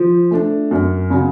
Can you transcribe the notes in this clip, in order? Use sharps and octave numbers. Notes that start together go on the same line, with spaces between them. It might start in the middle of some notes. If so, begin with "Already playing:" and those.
Already playing: F3
A3 D4
F#2
C#3 F#3